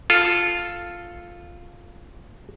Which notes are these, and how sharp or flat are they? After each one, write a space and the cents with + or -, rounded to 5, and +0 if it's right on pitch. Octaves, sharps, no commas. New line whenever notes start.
F4 +0 A4 +0